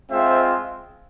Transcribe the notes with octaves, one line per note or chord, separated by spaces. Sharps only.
G#3 C4 F4 C5 E5